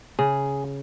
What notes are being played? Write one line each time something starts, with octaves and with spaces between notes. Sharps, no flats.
C#3 G#4